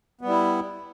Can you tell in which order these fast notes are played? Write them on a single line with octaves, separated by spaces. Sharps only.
B3 G3 E4